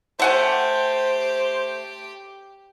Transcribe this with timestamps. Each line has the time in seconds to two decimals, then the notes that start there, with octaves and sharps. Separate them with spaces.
0.19 A3 G4 C5 F#5 G#5